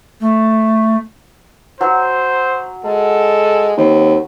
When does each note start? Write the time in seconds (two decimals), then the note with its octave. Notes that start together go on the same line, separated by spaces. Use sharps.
0.20 A3
1.81 F#3 C5
2.85 G#3 A4
3.78 D#2 C4